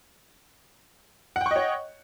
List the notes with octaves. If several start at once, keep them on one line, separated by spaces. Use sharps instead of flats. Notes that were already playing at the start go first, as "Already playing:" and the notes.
C#5 D#5 F#5 G5 C#6